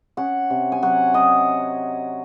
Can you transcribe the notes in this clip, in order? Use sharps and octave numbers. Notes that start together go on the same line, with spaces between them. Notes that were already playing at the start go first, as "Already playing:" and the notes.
C#4 F#5
C3
G#5
F#3 F#5
F#3 D#5